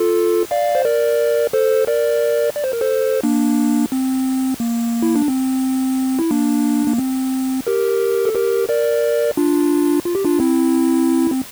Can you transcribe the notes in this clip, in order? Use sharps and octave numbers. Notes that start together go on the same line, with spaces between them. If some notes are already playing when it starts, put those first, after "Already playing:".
Already playing: F4 A4
D5 F5
C5
A#4 D5
A4 C5
A#4 D5
D5
C5
A#4
A4 C5
A#3 D4
C4
A#3
E4
D4
C4
E4
A#3 D4
A#3
C4
G4 A#4
A4
G4 A#4
A#4 D5
D4 F4
F4
G4
D4 F4
C4 E4
C4